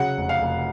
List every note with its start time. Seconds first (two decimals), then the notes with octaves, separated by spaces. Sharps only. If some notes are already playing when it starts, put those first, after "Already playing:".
Already playing: C#3 F#3 F#5
0.17 F1
0.29 F5
0.41 F1